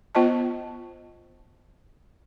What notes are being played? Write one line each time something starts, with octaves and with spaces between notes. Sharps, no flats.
B3 F4 C5 D#5 A5